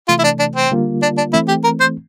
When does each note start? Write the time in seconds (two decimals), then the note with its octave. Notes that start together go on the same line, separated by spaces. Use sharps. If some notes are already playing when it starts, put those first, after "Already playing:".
0.08 C3 E3 A3 F4
0.19 E4
0.24 D4
0.39 D4
0.55 C4
0.71 D3 G3 A#3 F4
1.02 D4
1.17 D4
1.33 E3 A3 C4 E4
1.48 G4
1.64 A#4
1.80 C5